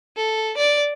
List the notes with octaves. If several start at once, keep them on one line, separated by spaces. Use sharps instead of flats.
A4
D5